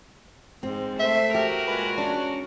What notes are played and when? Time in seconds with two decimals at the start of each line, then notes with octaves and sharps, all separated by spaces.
0.63 G#2 C4
1.00 A3 C5 E5
1.34 F#4 G4 A#4
1.67 A#2 G#3 B4 G#5
1.98 C#4 D4